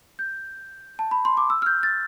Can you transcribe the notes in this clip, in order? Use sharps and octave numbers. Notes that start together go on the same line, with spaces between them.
G6
A5
B5
C6
D6
E6
F6
G6
A6